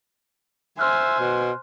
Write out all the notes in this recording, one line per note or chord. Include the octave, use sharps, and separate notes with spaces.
C5 E5 G#5 C6 F6 F#6
B2